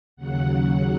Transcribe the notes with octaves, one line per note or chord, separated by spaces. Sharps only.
D#2 C#3 F#3 F#5